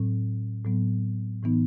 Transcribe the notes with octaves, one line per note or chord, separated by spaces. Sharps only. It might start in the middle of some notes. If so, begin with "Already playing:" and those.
Already playing: A2 F#3 C4
A2 F#3 B3
A2 E3 B3 D#4